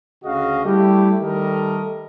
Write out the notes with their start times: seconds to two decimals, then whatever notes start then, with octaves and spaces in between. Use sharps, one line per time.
0.23 D2 C#3 F#4 G#4 D#5 F5
0.64 G3 A3 E4 G4
1.20 D#3 G3 A3 A4 A#4 D#5